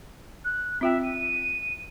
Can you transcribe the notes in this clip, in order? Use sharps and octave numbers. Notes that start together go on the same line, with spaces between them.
F#6
C4 F4 E5 G5
D#7